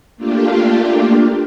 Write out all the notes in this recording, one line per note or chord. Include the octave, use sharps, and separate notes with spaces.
A3 A#3 D4 F4 G4